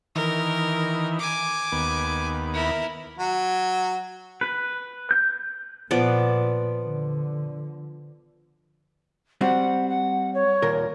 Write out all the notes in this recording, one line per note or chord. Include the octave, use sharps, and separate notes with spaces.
D#3 E3 A#4
G#5 D6
D#2 B3
E4 A#4
F#3
B4
G6
A#2 F3 B3 D5
D3
G3 C4 F#4 F#5
F#5
C#5
D#2 A#2 A#4